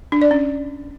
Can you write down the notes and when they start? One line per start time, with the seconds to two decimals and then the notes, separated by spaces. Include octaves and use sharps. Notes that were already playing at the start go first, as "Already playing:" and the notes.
0.12 D4
0.22 D5
0.31 C#4